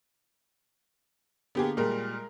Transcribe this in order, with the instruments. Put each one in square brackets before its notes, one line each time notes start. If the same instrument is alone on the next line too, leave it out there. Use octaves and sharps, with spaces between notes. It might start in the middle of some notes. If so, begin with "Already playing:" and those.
[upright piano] D3 A#3 [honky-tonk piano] B3 G4 G#4
[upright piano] A#2 G3 [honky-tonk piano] G#3 A#4